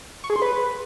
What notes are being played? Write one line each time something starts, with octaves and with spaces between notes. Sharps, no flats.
C#6
G#4
C6
B4